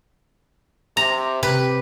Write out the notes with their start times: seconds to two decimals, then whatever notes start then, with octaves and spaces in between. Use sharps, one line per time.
0.97 C3 A#5
1.43 C3 G4 B4